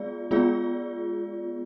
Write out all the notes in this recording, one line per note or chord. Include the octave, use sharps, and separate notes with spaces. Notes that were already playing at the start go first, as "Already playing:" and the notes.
Already playing: G#3 B3 F4 G#4 D5
G#3 B3 F4 G#4 D5